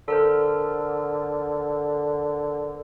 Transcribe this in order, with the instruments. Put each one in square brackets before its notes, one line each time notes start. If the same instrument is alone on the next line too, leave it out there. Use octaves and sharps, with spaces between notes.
[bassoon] D3 [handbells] A4 A#4 C5